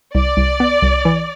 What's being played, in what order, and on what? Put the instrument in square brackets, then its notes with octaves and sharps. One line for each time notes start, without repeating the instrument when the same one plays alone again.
[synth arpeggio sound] C2 [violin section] D5
[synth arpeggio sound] C2
B3
C2
E3